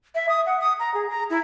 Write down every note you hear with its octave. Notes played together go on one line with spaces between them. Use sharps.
E5
D#6
F#5
D#6
A#5
G#4
A#5
E4